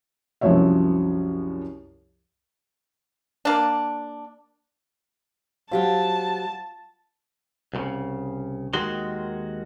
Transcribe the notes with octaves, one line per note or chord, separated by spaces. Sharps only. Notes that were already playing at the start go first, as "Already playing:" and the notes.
C2 F#2 F3 F#3 C#5 E5
A#3 D4
F#3 F4 G4 C5 A5
C2 A#2 C#3
D#2 D#3 G#3 F#4 C6